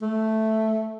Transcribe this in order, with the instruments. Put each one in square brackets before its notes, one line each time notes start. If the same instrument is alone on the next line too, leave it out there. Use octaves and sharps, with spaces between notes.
[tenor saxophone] A3